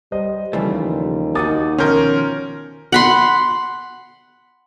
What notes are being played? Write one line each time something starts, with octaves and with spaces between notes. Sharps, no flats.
G3 C5 D#5
D#2 C#3 E3 F3 G3 A3
A#3 D#4 F#4 D6 D#6 A6
B2 D#3 F3 C#4 A#4 C6 G6
F#5 B5 C6